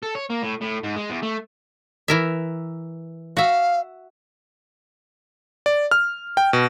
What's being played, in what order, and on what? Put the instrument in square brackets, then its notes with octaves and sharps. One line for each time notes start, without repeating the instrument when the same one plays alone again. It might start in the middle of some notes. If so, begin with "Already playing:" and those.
[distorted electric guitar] A4
C#5
A#3
A2
A2
G#2
G#3
E2
A3
[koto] E3 A#4 E5
[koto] F#4 E5 [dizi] F5
[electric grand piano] D5
F6
G5
B2